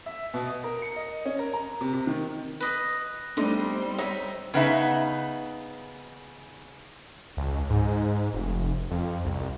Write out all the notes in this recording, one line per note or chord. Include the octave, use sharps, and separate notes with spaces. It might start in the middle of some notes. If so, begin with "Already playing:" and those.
E5
B2
D#6
A#4
C#7
D#5
C#4
A#4
A#5
C3
C3
D#3
B4 D#5
G3 A3 B3 C4 D4 D#4 C6
D#4 C#5 E5
C#3 B3 D#4 E5
C#2
G#2
F1
F2
C2